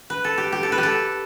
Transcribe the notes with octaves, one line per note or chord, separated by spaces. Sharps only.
B4
A4
G4
G4
A4
B4
G4
A4